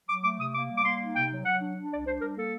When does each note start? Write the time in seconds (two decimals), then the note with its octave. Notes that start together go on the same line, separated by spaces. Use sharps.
0.08 F#3 D6
0.24 A3 D6
0.40 C3 D#6
0.54 A#3 D6
0.70 G3
0.77 D6
0.84 A#3 C6
1.00 D#4
1.14 C3 G5
1.31 F#3
1.45 F#3 F#5
1.60 D4
1.76 D4
1.91 C2 D5
2.06 D4 C5
2.21 G3 A#4
2.37 A#3 A4